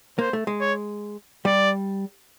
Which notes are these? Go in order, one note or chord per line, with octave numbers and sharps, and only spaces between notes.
A#3 C5
A3
G#3
C#5
G3 D5